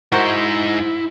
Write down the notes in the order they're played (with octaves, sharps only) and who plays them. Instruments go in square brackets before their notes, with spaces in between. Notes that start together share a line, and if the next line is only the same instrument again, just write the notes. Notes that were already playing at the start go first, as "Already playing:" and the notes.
[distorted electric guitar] G#2 D#4 [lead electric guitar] E4 [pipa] F#4 A#4 C5